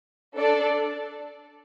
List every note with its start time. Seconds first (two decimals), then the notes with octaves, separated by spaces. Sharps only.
0.37 D4 A4 D5